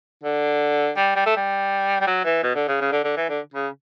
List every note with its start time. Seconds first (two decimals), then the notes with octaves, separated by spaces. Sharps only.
0.24 D3
0.97 G3
1.16 G3
1.26 A3
1.36 G3
2.01 G3
2.07 F#3
2.25 E3
2.43 B2
2.55 D3
2.68 C#3
2.81 C#3
2.92 D3
3.04 D3
3.17 E3
3.29 D3
3.54 C#3